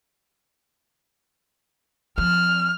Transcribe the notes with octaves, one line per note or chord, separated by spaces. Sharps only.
F3 C4 F6